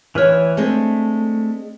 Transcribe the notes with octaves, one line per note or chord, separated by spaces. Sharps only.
D2 E3 B4 C#5 F6
G#3 A3 C4 D4